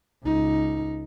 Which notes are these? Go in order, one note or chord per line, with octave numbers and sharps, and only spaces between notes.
C#2 D#4